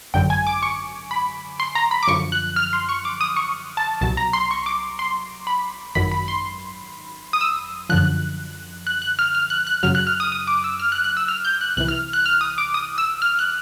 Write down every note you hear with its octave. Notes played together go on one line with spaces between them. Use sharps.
G#1 F#2 D3 F#3 G5
G#5
D6
C#6
B5
C6
A#5
B5
D6
F#2 D3 F3 C#6
F#6
F6
C6
C#6
D6
D#6
C#6
A5
C2 B2 F#3 A5
A#5
C6
C#6
D6
C6
B5
G#1 F#2 D#3 F#3 B5
B5
C6
D#6
E6
F#2 D3 F3 F#6
F#6
F#6
F6
F6
F#6
F#6
F#2 C#3 F#3 F6
F#6
F6
D#6
D#6
D6
E6
F6
F#6
F#6
E6
F6
G6
F#6
C2 C3 E3 F#6
F6
F#6
F6
D#6
D6
D#6
E6
F6
F#6